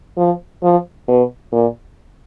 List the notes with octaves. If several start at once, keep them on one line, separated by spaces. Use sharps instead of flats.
F3
F3
B2
A#2